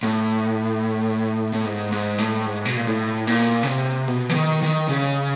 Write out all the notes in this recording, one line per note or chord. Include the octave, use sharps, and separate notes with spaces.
A2
A2
G#2
G#2
A2
G#2
B2
A#2
A2
A#2
C#3
C3
B2
E3
D#3
D#3
C#3